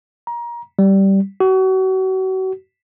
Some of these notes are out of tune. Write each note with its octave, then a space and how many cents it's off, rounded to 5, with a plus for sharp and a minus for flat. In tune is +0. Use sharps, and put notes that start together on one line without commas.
A#5 +25
G3 -10
F#4 +35